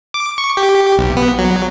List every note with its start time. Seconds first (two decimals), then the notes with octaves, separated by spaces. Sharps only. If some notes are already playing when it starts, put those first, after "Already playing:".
0.14 D6
0.38 C#6
0.57 G4
0.97 B1
1.17 B3
1.39 F#3